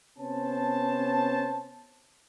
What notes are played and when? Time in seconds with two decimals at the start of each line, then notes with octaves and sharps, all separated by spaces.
0.18 C3 B3 C#4 C5 A5